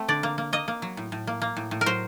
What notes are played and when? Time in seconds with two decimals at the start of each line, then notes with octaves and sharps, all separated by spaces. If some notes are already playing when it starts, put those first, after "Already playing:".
Already playing: A3 C4
0.08 D3 D5
0.23 A#3
0.38 A#3
0.53 A#3 D#5
0.68 A#3
0.82 F#3
0.97 A2
1.12 A2
1.27 A#3
1.42 A#3
1.57 A2
1.71 A2
1.81 A#4
1.86 F#3 C5